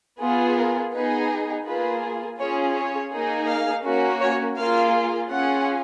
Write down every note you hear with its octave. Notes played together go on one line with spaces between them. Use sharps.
B3 F4 G#4
A#4
B3 D#4 G#4 B4
A#3 F4 G#4 B4
C#4 F4 G#4 C#5
C#5
A#3 D#4 G#4
F5
A#3 C#4 F#4
C#5
A#3 F4 G#4 F5
C#4 F4 G#4 F#5